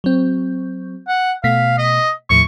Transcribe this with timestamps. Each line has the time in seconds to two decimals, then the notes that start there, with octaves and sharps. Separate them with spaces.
0.04 F#3 C4
1.08 F#5
1.44 B2 A3 F5 B6
1.78 D#5
2.30 D#2 A2 F3 C#6